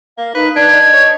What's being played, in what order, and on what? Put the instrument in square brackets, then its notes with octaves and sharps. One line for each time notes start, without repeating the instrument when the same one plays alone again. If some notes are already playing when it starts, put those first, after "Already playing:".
[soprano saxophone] A#3 [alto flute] F5
[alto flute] D#4 [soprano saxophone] B4
[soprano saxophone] D4 [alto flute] D5 [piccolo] G#6
[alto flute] D#5
[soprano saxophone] C#5